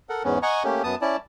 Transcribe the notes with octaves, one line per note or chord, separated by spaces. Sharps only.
A4 A#4 F#5
E2 G#2 B3 C#4
D#5 F#5 G#5 A#5 C#6
A3 A#3 C#4 G4
F#2 B3 A5 D#6
C#4 E4 D5 A5